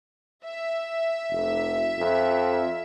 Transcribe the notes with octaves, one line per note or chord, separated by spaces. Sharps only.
E5
F1
F2